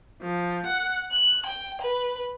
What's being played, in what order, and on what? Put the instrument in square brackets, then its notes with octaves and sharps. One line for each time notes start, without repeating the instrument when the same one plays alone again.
[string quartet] F3
F#5
F#6
G5
B4